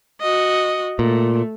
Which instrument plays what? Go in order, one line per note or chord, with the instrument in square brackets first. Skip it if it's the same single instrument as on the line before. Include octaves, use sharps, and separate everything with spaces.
[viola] F#4 D#5
[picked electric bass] A#2 [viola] A3